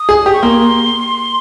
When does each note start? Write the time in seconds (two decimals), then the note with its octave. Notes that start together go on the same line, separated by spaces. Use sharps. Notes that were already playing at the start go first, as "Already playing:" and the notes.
Already playing: D#6
0.09 G#4
0.26 G4
0.33 C#6
0.42 A#3 C6